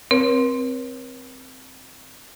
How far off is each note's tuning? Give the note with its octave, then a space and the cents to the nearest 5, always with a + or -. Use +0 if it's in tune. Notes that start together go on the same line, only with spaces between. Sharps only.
C4 +0 A#4 +45 C#5 -20